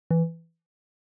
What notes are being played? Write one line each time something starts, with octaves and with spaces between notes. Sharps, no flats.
E3